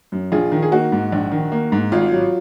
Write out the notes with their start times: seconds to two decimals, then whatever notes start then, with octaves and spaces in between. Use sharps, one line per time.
0.12 F#2
0.32 A#1 F4 G#4
0.52 D#3
0.62 G#4
0.72 A#3 D#4 F#4
0.92 G#2
1.12 A#1
1.31 D#3
1.52 A#3
1.72 G#2
1.92 G#1 F4
2.12 F#3